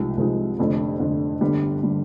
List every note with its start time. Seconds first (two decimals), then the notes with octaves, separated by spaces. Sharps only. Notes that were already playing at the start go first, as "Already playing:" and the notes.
Already playing: C2 C3 F3 G#3 D#4
0.17 C2 C3 F3 G#3 D#4
0.59 F1 F2 D3
1.00 F1 F2 D3
1.41 G1 G2 D3 G3
1.83 D3 G3